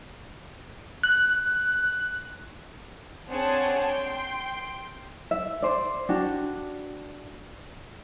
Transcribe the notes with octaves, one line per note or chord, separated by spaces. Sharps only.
F#6
C4 D4 G#4 C#5 F#5 A5
G5 C6
E5
C5 D5
D4 F#4 G4